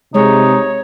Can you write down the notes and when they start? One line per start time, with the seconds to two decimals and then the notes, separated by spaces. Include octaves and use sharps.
0.14 C3 G#3 D#4 C#5